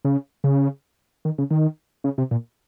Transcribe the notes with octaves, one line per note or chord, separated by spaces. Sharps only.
C#3
C#3
D#3
C#3
D#3
C#3
C3
A#2